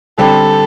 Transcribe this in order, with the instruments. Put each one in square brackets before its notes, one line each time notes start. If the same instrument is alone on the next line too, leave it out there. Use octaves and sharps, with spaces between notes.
[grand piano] D3 G3 C4 G4 [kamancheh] A4